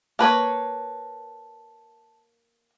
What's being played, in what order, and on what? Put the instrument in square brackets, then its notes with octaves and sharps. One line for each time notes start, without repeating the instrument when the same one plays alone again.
[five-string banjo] A#3 B4 C#5 [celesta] A5